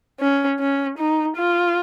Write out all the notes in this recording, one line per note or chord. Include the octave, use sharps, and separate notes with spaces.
C#4
C#4
D#4
F4